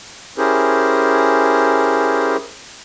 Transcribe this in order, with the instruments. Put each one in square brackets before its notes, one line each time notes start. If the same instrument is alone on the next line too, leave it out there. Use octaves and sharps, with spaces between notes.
[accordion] C#4 E4 G4 G#4 A#4 C5